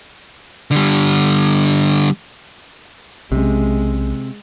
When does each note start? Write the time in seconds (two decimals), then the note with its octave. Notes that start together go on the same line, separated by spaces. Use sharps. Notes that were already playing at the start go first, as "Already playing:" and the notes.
0.71 D3 G3
3.32 B1 C3 G#3 C#4